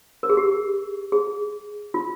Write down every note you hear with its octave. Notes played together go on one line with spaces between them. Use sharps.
A#4
G#4
G4
G#4
F4